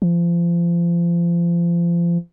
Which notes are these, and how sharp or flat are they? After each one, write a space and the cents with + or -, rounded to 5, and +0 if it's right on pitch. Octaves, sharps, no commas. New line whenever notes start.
F3 -30